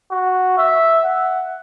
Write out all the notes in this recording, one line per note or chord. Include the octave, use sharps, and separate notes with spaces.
F#4
E5
F#5